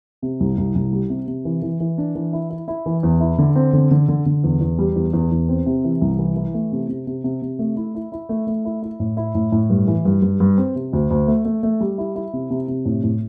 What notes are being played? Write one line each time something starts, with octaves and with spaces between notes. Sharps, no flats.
C3
C2
C2
C2
G3
C3
C3
E3
E3
E3
D4
E3
E4
E4
E4
E3
E2
E4
D3
C4
D3
D3
D3
D3
E2
E2
G3
E2
E2
E2
C4
C3
E3
C2
E3
E3
A3
C3
C3
C3
C3
C3
A3
E4
E4
E4
A3
A3
E4
E4
A2
E4
A2
A2
G2
E3
G2
G2
G2
C4
C3
D2
D2
A3
A3
A3
G3
E4
E4
C3
C3
C3
A2
A2